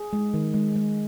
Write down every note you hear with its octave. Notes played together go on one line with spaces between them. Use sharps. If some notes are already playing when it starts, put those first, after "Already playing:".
Already playing: G#4
G#3
D#3
G#3
G#3